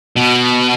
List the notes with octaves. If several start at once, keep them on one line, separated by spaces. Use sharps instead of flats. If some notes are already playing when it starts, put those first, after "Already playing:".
B2